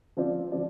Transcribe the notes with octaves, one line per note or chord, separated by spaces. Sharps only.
F3 C4 F4 D5
F3 C4 F4 D5